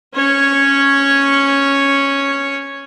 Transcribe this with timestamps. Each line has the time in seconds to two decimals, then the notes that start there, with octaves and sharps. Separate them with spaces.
0.15 C#4 C#5